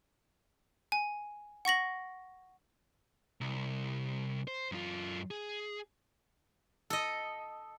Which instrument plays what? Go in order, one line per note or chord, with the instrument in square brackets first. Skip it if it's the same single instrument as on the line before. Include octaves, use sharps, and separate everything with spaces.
[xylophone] G#5
F#5 C#6 A#6 F#7
[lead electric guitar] C2
C5
F#2 F4
G#4
[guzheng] A4 D#5